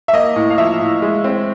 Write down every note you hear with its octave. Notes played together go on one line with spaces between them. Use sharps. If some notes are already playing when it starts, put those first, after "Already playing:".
E5
A#3 D#5
A2
F5
F3 E5
A2
G#3
C4